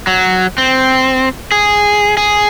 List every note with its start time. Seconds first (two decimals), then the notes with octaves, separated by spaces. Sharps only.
0.07 F#3
0.58 C4
1.52 G#4
2.17 G#4